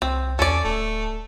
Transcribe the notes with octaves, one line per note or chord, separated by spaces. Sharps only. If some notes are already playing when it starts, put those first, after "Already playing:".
C2 C4
E2 C#4 A4 D5
D1 A3